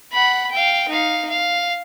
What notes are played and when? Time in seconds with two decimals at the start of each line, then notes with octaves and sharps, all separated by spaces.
0.12 F#5 B5
0.51 F5 G5
0.89 D#4 F5
1.30 F5